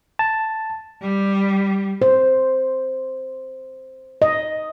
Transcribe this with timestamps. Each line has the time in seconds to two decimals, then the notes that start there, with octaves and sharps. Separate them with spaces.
0.19 A5
1.02 G3
2.02 C5
4.22 D#5